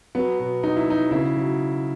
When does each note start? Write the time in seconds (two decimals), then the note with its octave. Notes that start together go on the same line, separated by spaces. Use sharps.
0.15 F#3 B3
0.39 B2
0.63 F#3 D#4
0.76 E4
0.88 F#3 D#4
1.11 C#3 E4
1.35 F#3